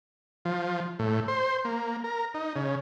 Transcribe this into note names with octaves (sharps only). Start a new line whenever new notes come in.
F3
A2
C5
A#3
A#4
D#4
C#3